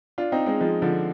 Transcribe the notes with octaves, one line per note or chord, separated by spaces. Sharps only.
D4 F4
C4 D#4
G#3 C4
F3 G#3
D3 F3